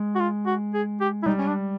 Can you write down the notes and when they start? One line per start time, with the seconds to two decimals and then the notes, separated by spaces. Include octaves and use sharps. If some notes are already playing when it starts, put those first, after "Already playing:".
Already playing: G#3
0.15 F#4
0.20 F4
0.46 F#4
0.74 G#4
1.01 G4
1.23 E4
1.26 G3 D#4
1.38 C#4
1.47 D4